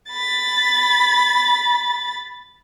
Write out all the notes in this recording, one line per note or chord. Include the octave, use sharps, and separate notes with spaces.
B5 A6